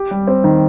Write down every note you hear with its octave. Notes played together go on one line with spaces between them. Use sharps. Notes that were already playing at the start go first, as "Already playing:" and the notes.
Already playing: G4
G3
C4
D#3